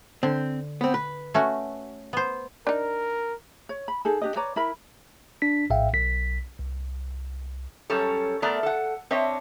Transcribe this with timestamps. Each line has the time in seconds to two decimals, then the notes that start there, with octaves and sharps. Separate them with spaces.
0.23 D3 C4
0.81 B3 C4
0.94 B4
1.34 A3 C#4 F#4
2.13 B3 C5
2.67 D4 D#4 A#4
3.69 C#5
3.88 B5
4.05 D#4 G#4 A4
4.22 D4 G4 D#5
4.36 B4 C#5 D5 A#5
4.56 E4 A#4 B5
5.42 D4 B6
5.70 A#1 A2 E5 F5 G5
5.94 B1 B6
6.59 C2
7.90 F#2 G3 C#4 A4 C#5
8.42 A3 B3 A#4 D5 A#5
8.63 A4 F#5
9.11 C4 D4 C#5 D#5 E5